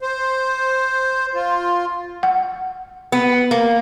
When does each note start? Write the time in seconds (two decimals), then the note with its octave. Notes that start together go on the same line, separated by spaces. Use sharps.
0.01 C5
1.35 F4
2.23 F#5
3.12 B3
3.51 A#3